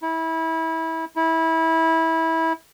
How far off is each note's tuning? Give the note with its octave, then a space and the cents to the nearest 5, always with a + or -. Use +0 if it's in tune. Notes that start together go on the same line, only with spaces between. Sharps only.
E4 -25
E4 -20